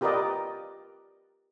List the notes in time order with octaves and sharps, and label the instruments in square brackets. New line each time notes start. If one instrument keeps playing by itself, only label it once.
[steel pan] F4 G4 A#4 B4 D5 D#5